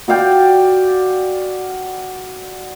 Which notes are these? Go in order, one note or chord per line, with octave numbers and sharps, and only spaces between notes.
F#4 D5 F5 G5